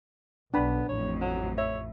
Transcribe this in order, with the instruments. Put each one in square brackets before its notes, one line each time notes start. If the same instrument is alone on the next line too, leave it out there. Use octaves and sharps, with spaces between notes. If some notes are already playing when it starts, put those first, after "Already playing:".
[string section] B1 [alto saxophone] B3 [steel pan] D4 B5
[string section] A1 F2 [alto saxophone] C#5
[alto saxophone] F#3
[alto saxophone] C#5 [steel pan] E5